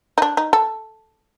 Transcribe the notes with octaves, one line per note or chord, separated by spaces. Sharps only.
D#4
D4
D#4
A4